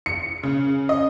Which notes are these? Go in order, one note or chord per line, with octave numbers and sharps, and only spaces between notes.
C#7
C#3
D#5